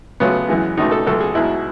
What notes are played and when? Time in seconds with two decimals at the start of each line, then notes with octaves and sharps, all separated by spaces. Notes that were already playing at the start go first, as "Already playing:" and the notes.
0.20 C#2 C#3 F#3 A3 B3
0.48 F#2 E3 G#3
0.77 C#2 B2 A3 D#4
0.92 A4
1.06 C#2 B2 F#3 A3 A4
1.21 G#4
1.35 B1 B2 G#3 E4